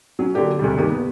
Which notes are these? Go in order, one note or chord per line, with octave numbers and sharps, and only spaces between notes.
F#3 C#4
D3 F#3 A#3 G4 D5
D2 C3 G3
G2 D#3 A#3 G4
B3